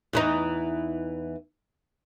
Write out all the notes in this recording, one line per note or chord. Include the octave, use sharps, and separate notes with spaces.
E2 E3 D#4